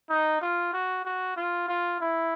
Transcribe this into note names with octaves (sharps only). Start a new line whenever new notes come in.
D#4
F4
F#4
F#4
F4
F4
E4